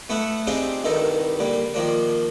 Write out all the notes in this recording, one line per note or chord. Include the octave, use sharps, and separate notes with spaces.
A3 B3 E4 A4 E5 F#5
C4 D4 D#4 F4 G4 G#4
C2 G2 D#3 D#4 A4
D3 G3 A#3
D#3 F3 A#3 D4